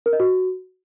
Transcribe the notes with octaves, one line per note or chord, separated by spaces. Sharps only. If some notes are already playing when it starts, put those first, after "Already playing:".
A#4
D#5
F#4